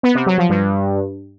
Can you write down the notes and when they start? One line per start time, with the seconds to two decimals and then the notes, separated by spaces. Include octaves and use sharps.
0.03 B3
0.15 C3
0.26 F#3
0.38 F3
0.49 G2